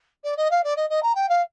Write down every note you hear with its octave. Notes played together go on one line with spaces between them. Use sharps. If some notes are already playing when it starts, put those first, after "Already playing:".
D5
D#5
F5
D5
D#5
D#5
A#5
G5
F5